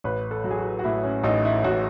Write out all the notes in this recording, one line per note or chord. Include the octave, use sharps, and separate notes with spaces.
A1 B4
A4
F#3
G#4
F#4
F#4
A2 E4
C#4
A1 D#4
E4
A1 F#4